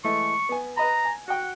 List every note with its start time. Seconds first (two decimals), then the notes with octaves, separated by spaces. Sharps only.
0.04 E3 G#3 A3 C#6
0.49 B3 G#5
0.77 B4 D#5 A#5 B5
1.05 G#5
1.28 F#4 F#5 G5